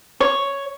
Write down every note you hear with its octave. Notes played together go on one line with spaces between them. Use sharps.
C#5